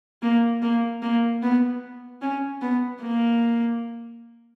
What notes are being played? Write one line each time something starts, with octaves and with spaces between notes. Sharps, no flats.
A#3
A#3
A#3
B3
C#4
B3
A#3